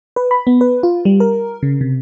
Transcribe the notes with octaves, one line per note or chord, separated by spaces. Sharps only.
B4
B5
B3
B4
F4
G3
A#4
C#3
C3